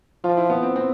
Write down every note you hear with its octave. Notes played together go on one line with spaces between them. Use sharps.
F3 F4
E4
B3
C4
C4